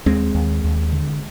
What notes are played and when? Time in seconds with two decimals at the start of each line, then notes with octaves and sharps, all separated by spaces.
0.06 D#2 G#3 C4
0.35 D#2
0.64 D#2
0.92 D3